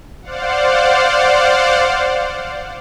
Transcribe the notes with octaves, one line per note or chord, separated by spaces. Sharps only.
C5 D5 F5 F#5